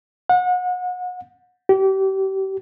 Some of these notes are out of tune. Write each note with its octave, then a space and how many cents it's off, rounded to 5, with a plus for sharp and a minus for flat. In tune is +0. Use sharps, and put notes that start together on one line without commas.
F#5 -35
G4 -30